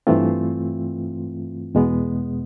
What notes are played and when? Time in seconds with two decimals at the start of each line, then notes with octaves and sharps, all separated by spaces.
0.07 G2 E3 A3 C4 F4
1.75 E2 B2 G#3 B3